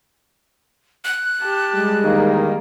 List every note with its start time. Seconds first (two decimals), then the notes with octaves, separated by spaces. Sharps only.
1.05 F#6
1.42 G4 A5
1.74 G3 G#3
2.04 E2 D#3 A#3 D#4